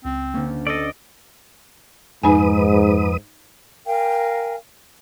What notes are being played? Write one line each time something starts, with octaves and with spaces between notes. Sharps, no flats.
C#2 C4
D2 A#3 C#4
A4 D5 D#5
F2 G#2 D#4 B4 G#5 D#6
A#4 F5 G5 G#5